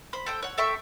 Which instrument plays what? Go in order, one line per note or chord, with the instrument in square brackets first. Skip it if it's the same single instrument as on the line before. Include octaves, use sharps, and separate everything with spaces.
[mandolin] C5 B5
A4 C5 G5
C#5 F#5
A4 E5 G5 C#6